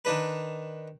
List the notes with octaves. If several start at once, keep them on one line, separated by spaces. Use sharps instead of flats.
D#3 D4 B4